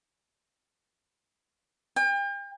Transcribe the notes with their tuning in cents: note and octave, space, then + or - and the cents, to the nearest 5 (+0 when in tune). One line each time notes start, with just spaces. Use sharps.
G5 +40